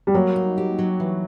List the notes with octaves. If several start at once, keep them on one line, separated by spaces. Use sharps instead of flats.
G3
F#3 A#3
D#4
G4
F#3
E3